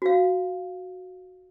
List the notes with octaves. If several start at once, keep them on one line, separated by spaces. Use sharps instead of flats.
F#4 F5